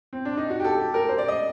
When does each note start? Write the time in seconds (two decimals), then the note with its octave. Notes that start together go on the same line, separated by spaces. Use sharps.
0.13 C4
0.25 D4
0.37 D#4
0.50 F#4
0.60 G4
0.64 A4
0.80 G4
0.94 A#4
1.09 C5
1.18 D5
1.28 D#5